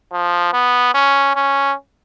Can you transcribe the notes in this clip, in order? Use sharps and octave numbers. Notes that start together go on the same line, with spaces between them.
F3
B3
C#4
C#4